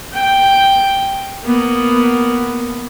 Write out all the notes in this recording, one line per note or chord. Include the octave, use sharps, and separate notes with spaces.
G5
A#3 B3